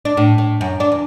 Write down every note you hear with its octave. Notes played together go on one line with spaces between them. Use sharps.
D4
A2
A2
F#2
D4
E2